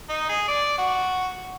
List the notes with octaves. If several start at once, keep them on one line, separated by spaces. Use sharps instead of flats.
D#4
G#4
D5
F#4